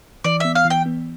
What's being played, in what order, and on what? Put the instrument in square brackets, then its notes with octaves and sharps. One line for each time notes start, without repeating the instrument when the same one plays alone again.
[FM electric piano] E3 [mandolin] D5
[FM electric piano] B3 [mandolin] E5
[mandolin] F5
[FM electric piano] E3
[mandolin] G5
[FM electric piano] B3